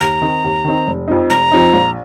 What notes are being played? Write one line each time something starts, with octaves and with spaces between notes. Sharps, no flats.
D#2 A#5
D#3 C4 D#4
D#2
D#3 C4 D#4
F1
F2 F3 C4 D#4
F1 A#5
F2 F3 C4 D#4
A#1